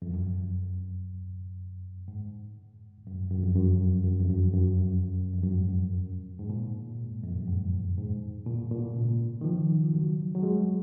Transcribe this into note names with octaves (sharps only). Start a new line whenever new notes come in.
F2
F#2
G#2
F#2
F#2
F2
F#2
F#2
F2
F#2
F#2
F2
F#2
G#2
G#2
A#2
F2
F#2
G#2
G#2
A#2
A#2
C#3
D#3
F3
F#3
F#3
G#3